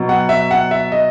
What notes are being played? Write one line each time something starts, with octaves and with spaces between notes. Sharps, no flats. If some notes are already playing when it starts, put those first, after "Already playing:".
Already playing: B2 F#3
F#5
E5
F#5
E5
D#5